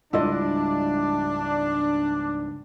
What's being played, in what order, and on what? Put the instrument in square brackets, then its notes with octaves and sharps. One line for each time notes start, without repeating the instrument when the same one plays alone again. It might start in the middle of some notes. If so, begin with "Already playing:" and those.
[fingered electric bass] C#2 G#2 G3 [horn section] D4 [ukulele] E4 F4 D#5